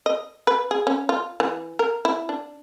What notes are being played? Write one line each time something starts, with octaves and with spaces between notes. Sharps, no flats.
D#5
B4
G#4
C#4
F4
E3
A#4
E4
D4